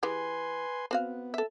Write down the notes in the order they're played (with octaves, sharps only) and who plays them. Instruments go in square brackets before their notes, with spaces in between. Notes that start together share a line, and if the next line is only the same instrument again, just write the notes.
[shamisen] E3 G4 G#4 [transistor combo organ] B4 G#5 C6
[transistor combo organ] B3 [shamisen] C4 F#4 F5
[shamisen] A4 E5